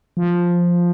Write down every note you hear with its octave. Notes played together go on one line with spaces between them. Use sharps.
F3